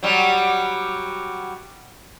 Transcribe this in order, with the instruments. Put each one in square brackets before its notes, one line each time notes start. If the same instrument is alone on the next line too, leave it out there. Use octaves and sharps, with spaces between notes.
[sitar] F#3 G3